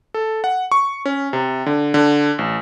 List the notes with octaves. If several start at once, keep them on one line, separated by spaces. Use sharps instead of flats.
A4
F#5
C#6
C#4
C3
D3
D3
A1